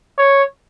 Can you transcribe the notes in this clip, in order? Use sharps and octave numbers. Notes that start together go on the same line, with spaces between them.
C#5